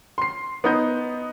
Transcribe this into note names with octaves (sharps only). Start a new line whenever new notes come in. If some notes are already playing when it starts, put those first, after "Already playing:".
C6 C7
B3 D#4 G6